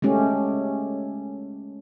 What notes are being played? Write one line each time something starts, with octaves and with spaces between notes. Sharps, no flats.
G#3 A3 C#4 G4